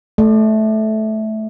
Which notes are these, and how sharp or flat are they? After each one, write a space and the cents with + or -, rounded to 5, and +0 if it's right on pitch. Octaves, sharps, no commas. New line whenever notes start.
A3 -15 D5 +35